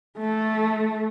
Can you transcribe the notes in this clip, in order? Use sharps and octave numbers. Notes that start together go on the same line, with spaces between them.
A3